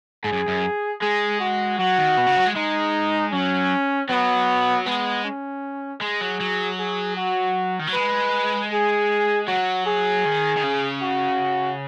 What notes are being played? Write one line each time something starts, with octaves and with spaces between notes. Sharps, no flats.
G#2 G#4
F#2
F#2
G#3 G#4
F#4
F#3 F#4
D#3
B2
C#3
F#3
G#3
G#3 D#4
F#3 C#4
F#3 B3
G#3 B3
C#4
G#3 G#4
F#3
F#3
G#4
F#4
D#3
F#3
G#3 B4
G#4
F#3 F#4
G#4
D#3
D#3
C#3
F#4